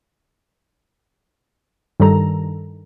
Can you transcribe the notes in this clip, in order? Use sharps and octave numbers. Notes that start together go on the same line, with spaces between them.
G2 D#3 G3 A4 A#5